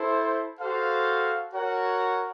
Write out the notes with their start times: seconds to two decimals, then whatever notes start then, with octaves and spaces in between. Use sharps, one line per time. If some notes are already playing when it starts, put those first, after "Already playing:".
Already playing: E4 A4 C5
0.60 F#4 A4 C5 F5
1.53 F#4 A#4 C#5 F#5